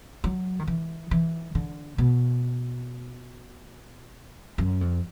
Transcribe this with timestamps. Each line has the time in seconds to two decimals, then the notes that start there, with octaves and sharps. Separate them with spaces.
0.24 F#3
0.59 D#3
0.67 E3
1.11 E3
1.55 D3
1.98 B2
4.58 F#2
4.81 F2